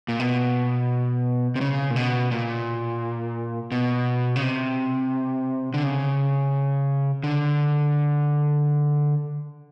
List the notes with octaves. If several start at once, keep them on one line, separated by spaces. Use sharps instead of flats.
A#2
B2
C3
C#3
A#2
B2
A#2
B2
C#3
C3
D3
C#3
D3